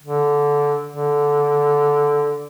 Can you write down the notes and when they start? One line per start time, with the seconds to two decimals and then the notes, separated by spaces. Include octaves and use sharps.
0.02 D3
0.89 D3